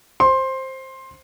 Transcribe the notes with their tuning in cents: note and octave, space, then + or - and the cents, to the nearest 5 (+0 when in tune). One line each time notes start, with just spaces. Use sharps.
C5 +10 C6 +15